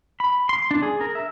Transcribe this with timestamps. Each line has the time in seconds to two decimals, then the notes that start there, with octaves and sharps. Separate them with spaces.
0.20 B5
0.49 C6
0.71 D4
0.83 G#4
1.01 A#4
1.15 E5